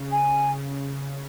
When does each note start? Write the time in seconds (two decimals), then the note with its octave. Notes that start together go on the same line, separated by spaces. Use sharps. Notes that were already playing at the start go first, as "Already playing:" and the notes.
Already playing: C#3
0.12 G#5
0.56 C#3